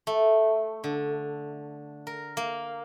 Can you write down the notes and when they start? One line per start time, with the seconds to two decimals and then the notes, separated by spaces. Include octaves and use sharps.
0.07 A3
0.84 D3
2.07 A#4
2.37 A#3